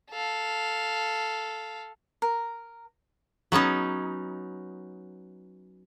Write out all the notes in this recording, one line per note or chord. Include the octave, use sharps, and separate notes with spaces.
A4 F5
A#4
F#3 B3 C#4 D#4